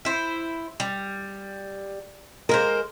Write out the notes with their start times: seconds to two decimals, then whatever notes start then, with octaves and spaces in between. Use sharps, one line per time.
0.05 E4 C5
0.80 G3
2.49 G#3 A#3 A#4 C5